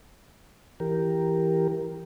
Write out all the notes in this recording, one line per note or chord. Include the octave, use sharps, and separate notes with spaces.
E3 G4 A#4